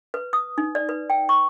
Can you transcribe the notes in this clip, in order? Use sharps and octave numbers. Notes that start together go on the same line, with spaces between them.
B4
D#6
D#4
D5
B4
G5
C#6